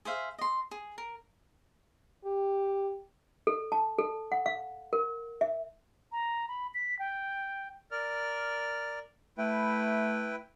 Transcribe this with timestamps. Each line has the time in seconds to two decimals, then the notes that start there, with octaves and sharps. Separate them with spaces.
0.05 G#4 C5 E5 F5
0.39 D#5 C6
0.71 G#4
0.98 A#4
2.25 G4
3.47 A4
3.72 A5
3.98 A4
4.32 F#5
4.46 F5
4.93 A#4
5.41 E5
6.12 A#5
6.48 B5
6.74 B6
6.99 G5
7.91 A#4 D5 F6
9.38 A3 E4 B4 G5